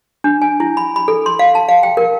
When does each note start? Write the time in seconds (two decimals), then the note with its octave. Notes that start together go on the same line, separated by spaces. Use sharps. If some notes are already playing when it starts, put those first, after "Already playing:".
0.24 D4
0.42 G#5
0.60 E4
0.77 B5
0.96 B5
1.08 A4
1.26 C6
1.39 F5
1.55 A5
1.69 F5
1.83 G5
1.97 A#4